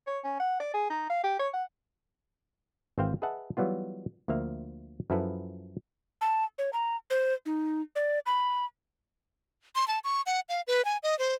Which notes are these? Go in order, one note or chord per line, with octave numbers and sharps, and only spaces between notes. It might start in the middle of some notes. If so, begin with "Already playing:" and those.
C#5
C#4
F#5
D5
G#4
D#4
F5
G4
C#5
F#5
G#1 E3 C4 C5 F5 G5
G#4 B4 D#5 E5 F#5 A5
E3 F#3 G3 B3 F4
D2 F3 A#3 E5 F5
F#2 F3 E4 A4 B4
A5
C#5
A#5
C5
D#4
D5
B5
C6
A5
C#6
F#5
F5
B4
G#5
D#5
C5